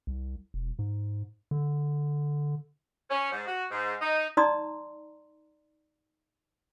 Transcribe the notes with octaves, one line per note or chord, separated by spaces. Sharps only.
C2
E1
G#2
D3
C#4
G#2
F#4
G#2
D#4
D#4 D5 A#5 C6 D#6